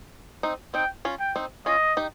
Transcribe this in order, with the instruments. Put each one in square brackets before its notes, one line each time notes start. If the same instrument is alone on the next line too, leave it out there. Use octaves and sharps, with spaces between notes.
[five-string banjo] C4 D#4
[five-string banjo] C4 D#4 [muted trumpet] G5
[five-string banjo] C#4 F4
[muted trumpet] G5
[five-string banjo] C4 D#4
[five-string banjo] C#4 F4 [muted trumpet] D#5
[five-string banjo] D#4 G4